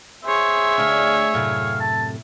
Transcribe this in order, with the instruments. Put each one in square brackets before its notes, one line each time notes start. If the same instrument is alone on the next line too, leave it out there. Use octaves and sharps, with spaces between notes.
[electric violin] G#4 C#5 [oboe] C5 [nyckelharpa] E5
[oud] D2 D4 [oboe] F5
[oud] F#2 A2 C3 [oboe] F5
[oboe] A5